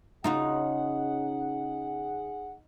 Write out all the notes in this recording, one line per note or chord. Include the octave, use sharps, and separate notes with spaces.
C#3 D#4 F4 F#4 G#4 F#5